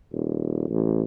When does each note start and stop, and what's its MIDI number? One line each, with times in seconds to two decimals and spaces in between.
0.12 0.65 27
0.69 1.03 33